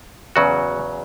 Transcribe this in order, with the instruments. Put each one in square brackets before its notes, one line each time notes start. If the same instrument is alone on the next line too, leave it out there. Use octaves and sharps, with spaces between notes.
[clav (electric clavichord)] E2 C#3 F#3 F#4